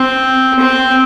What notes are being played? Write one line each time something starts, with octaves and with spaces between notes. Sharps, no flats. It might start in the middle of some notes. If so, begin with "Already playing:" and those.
Already playing: C4
C4